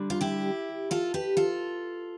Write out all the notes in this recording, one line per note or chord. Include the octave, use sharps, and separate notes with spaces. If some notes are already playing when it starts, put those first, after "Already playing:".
Already playing: D3 G3 D4
F4
E4 G4
F4 A4
G4 B4
F4 A4